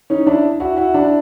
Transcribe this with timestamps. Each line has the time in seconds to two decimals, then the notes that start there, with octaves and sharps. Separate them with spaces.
0.10 C#4 D#4
0.27 D4 E4
0.60 E4 F#4
0.77 E4 F#4
0.93 D4 E4